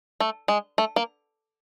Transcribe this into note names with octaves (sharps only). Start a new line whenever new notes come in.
A3
G#3
A3
A#3